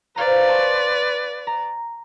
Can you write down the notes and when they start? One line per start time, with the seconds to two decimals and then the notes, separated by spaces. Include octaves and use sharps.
0.16 B4 C5 D5 F5 A#5
0.49 A5 C6 C#6
1.47 A#5